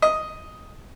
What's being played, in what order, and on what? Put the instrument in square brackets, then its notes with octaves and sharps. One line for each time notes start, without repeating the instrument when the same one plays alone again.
[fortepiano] D#5